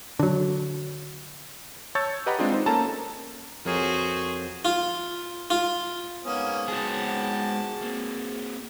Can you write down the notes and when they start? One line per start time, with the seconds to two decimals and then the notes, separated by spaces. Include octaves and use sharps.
0.19 D3 F#3
1.95 C#5 A5 C#6 E6 G6 A6
2.26 G4 B4 D#5 F#5 A#5 B5
2.39 G#3 C4 D4 F4 G#4
2.52 D#4 C5
2.66 A#3 C#4 A4 A5 A#5
3.65 F2 F#4 G#4 A#4 C5 C#5
4.65 F4
5.50 F4
6.25 F2 G#2 A#3 B3 C#4 D#6
6.68 G#3 F#4 G#4 C#5 A5
7.82 A#3 C4